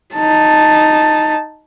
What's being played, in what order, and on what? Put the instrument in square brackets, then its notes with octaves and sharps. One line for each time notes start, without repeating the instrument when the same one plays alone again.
[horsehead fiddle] D#4 A5